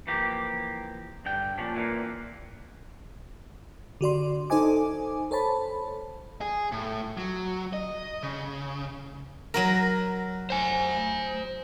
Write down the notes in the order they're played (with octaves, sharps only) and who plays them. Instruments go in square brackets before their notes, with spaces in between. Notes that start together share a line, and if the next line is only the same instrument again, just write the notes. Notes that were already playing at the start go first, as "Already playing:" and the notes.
[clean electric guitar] E3 F3 A#3 G4
G2 D3 G5
A#2 F3 C#4 D4
A#2 E3 A#3
[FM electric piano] D3 F#4 D5 C6
D#4 A4 C5 D#5 G#5 D6
A4 C5 C#5 A5 B5
[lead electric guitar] G#4
A2
F#3
D#5
C#3
[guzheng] F#3 F#4 A#4
[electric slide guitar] C5 G#5